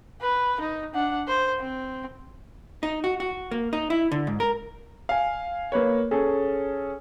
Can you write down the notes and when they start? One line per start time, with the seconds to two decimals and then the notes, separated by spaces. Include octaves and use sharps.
0.21 B4
0.60 D#4
0.95 D4 F#5
1.28 C5
1.60 C4
2.83 D#4
3.04 F#4
3.20 F#4
3.51 A#3
3.73 D#4
3.90 E4
4.12 D3
4.27 G#2
4.40 A#4
5.09 F5 G#5
5.72 A#3 B4 C#5
6.11 C#4 G#4 A4